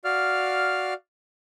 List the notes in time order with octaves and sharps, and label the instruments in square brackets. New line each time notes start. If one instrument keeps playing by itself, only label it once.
[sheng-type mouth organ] F#4 D5 F5 F6